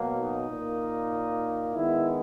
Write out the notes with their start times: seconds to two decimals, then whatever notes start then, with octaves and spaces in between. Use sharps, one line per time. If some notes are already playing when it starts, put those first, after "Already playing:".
Already playing: B2 F#3 A#3
0.16 D#4
0.48 A#2 A#3
1.74 D#3 G#3 B3 E4